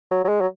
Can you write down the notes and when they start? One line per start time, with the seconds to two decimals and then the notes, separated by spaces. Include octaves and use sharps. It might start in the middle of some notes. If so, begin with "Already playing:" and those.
0.11 F#3
0.24 F#3
0.29 G#3
0.41 F#3